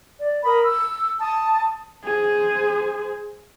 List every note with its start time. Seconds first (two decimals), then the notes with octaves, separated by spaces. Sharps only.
0.20 D5
0.44 A#4 B5 D#6
0.62 E6
1.20 A5 D#6
2.04 G#4 C5